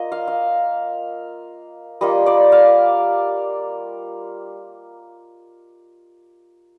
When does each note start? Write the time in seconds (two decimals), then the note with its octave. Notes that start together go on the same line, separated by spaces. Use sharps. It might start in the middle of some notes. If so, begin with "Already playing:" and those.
Already playing: A#3 F4 D#5
0.12 F5
0.27 F5
2.01 G3 A#3 F4 D#5
2.26 D5
2.52 F5